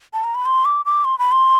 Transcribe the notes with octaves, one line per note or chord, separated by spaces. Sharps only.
A5
A#5
B5
C6
D6
D6
C6
B5
C6